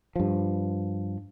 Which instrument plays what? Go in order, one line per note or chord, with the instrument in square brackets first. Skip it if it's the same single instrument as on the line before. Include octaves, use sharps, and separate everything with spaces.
[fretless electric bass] G2 F3